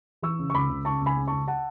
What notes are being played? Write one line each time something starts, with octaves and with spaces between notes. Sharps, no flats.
E3 C#6 E6
C#3
C#6
C#2 B5 D6
C#2
C#3 A5 C#6
C#2
G#5 B5
C#3
C#2 A5 C#6
F#5 A5